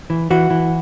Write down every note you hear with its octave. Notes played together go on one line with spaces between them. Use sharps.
E3
E3 F#4
E3